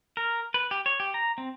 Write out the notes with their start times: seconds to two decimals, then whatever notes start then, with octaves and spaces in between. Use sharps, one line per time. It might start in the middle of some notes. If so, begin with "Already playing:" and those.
0.17 A#4
0.54 B4
0.71 G4
0.86 C#5
1.00 G4
1.14 A#5
1.38 C4